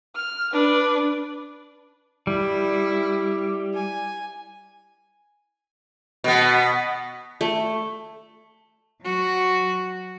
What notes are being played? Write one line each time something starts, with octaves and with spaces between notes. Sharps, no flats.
F6
D4 B4
G3 E4
G#5
B2 B3
A3
F#3 F#4